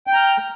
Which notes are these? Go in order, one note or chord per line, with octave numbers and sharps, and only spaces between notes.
G5 A#5 F6 G6